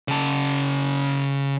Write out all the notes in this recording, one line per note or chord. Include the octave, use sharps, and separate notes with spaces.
C#3 A5